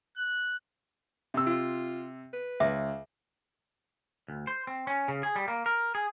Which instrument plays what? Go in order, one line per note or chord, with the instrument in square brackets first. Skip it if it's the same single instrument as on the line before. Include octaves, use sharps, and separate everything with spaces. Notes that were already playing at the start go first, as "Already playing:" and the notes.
[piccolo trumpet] F#6
[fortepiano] C3 E6
[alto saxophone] F4
B4
[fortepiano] C#2 [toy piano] E5 D6
[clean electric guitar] D2
C5
C4
C#4
C#3
G#4
G3
A#3
A#4
G#4